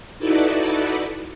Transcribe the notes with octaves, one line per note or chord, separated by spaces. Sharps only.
D#4 E4 F#4 A4 B4 D5